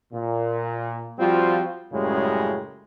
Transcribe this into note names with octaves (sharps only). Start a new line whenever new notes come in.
A#2
F3 G3 C4 F4 F#4
F#2 A2 C#3 G3 G#3